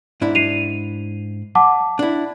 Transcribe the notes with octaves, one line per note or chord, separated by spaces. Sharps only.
G#2 D4 E4
C7 D#7 F7
F#5 A5 D6
D4 E4